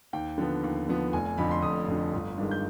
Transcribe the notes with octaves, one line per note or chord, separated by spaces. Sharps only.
D#2 G5
D3 F3 B3
D#2
D3 F3 B3
F1 G#5
G#5
F2 D3 B5
C6
F1 D#6
F2 D3
G1
G2 D#3 G#3
G6